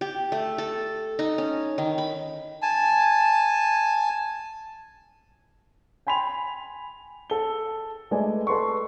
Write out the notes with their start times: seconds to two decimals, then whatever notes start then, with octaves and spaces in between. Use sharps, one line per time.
0.01 G4
0.32 A3
0.58 A4
1.19 D#4
1.38 C#4
1.78 D#3
1.98 B5
2.62 G#5 A5
6.07 G5 G#5 B5 C6 F7
7.30 A4 G7
8.11 G#3 A3 B4 D5 G#5
8.47 A4 B4 C6 C#6